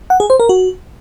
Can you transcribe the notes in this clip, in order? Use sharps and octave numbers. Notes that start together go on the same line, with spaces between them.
F#5
G#4
C5
A#4
F#4